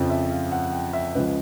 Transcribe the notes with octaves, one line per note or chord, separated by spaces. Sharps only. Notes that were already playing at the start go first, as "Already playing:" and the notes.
Already playing: F2 C#3 F3
E5
F5
F#5
G5
E5
C#2 C#3 F3 B4